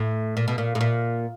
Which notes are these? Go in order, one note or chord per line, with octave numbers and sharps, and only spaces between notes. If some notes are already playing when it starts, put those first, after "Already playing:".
Already playing: A2
A#2
B2
A#2
A2
A#2